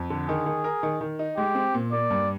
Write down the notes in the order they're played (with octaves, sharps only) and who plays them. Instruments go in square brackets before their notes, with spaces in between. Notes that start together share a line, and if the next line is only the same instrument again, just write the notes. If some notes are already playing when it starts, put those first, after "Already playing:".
Already playing: [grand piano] F2
D3
[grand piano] D#3 [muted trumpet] G#4
[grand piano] D#3
A#4
D#3
D#3
D#4
[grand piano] G#3 [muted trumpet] G4
[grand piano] C4
A#2
[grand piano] A#3 [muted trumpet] D5
[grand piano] G2